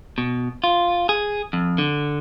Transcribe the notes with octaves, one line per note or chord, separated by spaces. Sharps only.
B2
F4
G#4
F2
D3